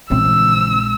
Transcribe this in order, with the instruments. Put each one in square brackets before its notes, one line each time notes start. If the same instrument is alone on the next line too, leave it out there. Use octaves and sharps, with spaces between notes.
[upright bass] A#1 G#3 [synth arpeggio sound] C#3 E3 C4 [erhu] E6